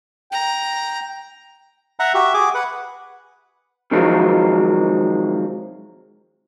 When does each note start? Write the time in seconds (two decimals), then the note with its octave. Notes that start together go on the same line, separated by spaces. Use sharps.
0.32 G5 A#5
1.99 E5 F#5 A#5
2.14 F#4 G4 E5
2.34 G#4 D6
2.54 B4 F#5
3.91 C3 D#3 F3 F#3 G#3 C4